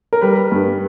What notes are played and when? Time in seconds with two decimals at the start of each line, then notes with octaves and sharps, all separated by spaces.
0.13 A#4
0.21 G3 B4
0.52 G2